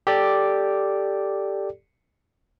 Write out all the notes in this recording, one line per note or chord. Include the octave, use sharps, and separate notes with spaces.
G4 A4 D5